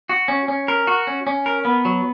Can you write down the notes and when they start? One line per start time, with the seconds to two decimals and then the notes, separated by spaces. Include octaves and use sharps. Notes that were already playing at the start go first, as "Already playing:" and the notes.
0.09 F#4
0.28 C#4
0.48 C#4
0.68 A#4
0.87 F#4
1.07 C#4
1.27 C#4
1.46 A#4
1.65 B3
1.85 F#3